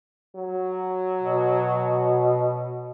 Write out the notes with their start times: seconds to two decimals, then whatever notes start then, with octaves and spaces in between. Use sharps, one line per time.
0.36 F#3
1.22 B2